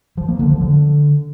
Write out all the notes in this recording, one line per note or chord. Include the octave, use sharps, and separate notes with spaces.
F3
A#3
D3
F3
D3